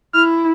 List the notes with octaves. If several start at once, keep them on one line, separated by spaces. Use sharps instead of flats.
E4 F6